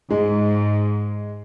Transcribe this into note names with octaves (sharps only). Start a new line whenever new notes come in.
G#2 G#3